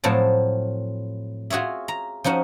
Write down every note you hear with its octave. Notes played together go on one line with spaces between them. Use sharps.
A2 F3 F#3 C4 A5
F4 F#4 G#4 C#5 E5
A#5
F3 C#4 D#4 F#4